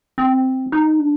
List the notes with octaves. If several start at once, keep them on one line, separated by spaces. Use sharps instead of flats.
C4
D#4
D4